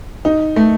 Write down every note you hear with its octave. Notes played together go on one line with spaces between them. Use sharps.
D#4
A3